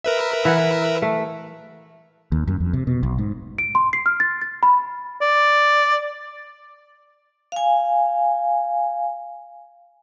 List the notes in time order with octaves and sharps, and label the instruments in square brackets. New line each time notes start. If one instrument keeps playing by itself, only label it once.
[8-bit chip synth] A#4 B4 E5
[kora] E3 F#5
A3
[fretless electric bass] D#2
F#2
F2
C3
B2
B1
G#2
[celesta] D7
C6
C7
F6
A6
A6
B5
[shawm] D5
[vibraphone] F5 G#5